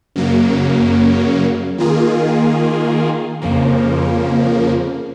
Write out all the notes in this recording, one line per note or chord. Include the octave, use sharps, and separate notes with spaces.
F#2 C#3 F#3 A#3
D#3 A#3 F4 G#4
F2 C#3 F3 A#3